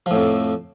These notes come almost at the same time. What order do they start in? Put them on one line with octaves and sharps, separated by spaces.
F3 A2 F2